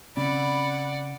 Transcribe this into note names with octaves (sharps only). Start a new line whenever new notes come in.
C#3 C4 C#4 D5 F#5 B5